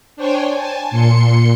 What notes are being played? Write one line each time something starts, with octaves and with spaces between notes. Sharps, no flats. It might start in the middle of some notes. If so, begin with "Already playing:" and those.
D4 C5 C#5 G5 G#5
G#5 A5
A#2 C6 C#7